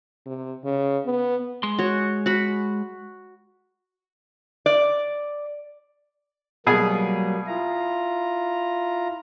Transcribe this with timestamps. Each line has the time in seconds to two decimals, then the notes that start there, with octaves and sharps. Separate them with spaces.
0.26 C3
0.64 C#3
1.06 B3
1.63 G#3 C6
1.78 F#4 C#5
2.26 F#4 B5
4.66 D5
6.67 B2 F#3 G3 A#3 G#4 G#5
7.47 E4 F4 A#5